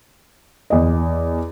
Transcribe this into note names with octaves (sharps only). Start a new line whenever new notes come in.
E2 D#5